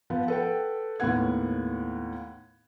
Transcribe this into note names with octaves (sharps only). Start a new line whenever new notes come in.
F3 B3
A4 B4 F#5 G5
D#2 A2 B3 F#5 G#6